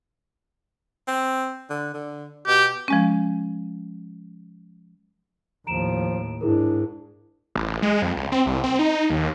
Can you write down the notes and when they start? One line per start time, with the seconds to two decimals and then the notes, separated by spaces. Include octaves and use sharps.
1.08 C4
1.70 D3
1.94 D3
2.47 B2 G4
2.88 F3 G#3 C#4
5.67 D#2 A2 F3 A#5 D7 E7
6.41 G#2 D4 E4 G#4 A#4
7.55 A1
7.82 G#3
8.02 F2
8.16 C#2
8.32 C4
8.46 C2
8.64 C4
8.79 D#4
9.10 D#2